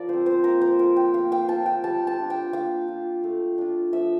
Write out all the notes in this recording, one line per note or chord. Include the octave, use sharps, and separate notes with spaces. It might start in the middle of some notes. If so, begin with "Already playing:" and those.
Already playing: F3 A#4 D5
C4 F4 C5
C5
A#3 A#4
C5
F4 A#4
G5
A#3 F5
G5
F4 A5
G5
G3 A5
A5
D4 F4
G5
A#3 F5
F4
A3
D4 F4
F3 E5